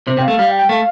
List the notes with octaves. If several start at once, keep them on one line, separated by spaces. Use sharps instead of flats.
C3 C5
C3 G5
F5
A3
G3 F5
G5
G5
A3 F5